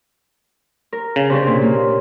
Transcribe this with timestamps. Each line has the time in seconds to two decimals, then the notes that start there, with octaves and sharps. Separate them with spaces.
0.93 A#4
1.16 C#3
1.30 C3 C#4 D4
1.46 A#2
1.62 A#3